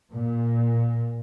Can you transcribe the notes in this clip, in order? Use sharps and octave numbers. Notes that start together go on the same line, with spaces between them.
A#2